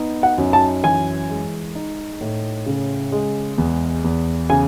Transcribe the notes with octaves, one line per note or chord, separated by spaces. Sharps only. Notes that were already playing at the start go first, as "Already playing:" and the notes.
Already playing: B3 D#4
F#5
F#2
A5
E3 G#5
G#3
D#4
A2
C#3
G#3
E2
E2
C#3 G#5